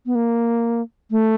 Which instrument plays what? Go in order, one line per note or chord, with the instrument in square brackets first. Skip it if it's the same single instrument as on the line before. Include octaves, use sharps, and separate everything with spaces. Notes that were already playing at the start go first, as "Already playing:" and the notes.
[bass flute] B3
A#3
A3